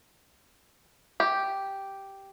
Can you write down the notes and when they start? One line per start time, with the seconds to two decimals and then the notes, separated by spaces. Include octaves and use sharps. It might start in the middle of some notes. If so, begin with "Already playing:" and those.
1.20 G4